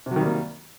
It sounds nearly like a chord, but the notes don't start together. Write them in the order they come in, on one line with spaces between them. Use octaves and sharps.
C3 F#3 D#3 G3 A#3